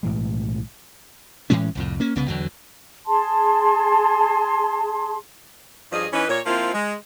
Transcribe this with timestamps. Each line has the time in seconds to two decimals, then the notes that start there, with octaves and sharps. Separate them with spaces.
0.03 B1 A2 E3 G#3
1.50 A2 E3 G#3 C#4
1.75 C2 F2 A2
2.00 A#3 C#4
2.16 C2 C#3 B3
2.28 E2 D3 F#3
3.07 G#4 A5 C6
5.92 G2 F3 G#4 D#5
6.13 E3 C#4 D#4 B4
6.28 A#2 C#5
6.46 F3 A#3 C4 E4 F4
6.74 G#3